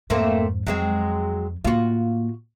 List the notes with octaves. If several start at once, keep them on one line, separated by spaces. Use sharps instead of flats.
F2 G#2 A3 A#3 C4
F2 F#3 G#3 C4
A2 A#3 F4 F#4